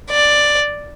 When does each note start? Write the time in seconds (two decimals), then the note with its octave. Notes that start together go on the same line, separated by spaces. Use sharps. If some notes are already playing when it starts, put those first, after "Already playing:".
0.10 D5